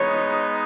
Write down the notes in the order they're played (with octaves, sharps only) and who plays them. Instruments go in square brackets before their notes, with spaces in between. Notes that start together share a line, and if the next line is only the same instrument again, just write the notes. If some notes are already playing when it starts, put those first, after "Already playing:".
Already playing: [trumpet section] G#3 B3 D#4 [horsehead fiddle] C#5